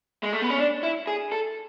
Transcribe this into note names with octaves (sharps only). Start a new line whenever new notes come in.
G#3
A3
B3
C#4
D4
E4
G#4
A4